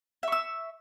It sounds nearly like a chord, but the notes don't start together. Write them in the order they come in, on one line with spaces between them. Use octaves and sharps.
E5 C#6 E6